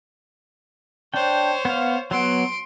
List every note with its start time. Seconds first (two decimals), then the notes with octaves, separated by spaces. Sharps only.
1.14 D4 C5 C#5 G5
1.65 B3 F5
2.11 F#3 B3 C6 D7